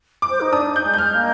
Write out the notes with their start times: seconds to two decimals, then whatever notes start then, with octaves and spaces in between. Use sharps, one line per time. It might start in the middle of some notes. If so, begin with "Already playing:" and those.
0.22 D6
0.30 C5
0.41 D#4
0.52 D4 D#6
0.76 G6
0.84 G#3
0.94 G6
0.98 F6
1.15 A#3